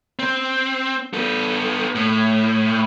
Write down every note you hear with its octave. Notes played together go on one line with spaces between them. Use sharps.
C4
B3 A4
A2